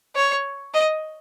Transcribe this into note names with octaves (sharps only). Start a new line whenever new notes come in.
C#5
D#5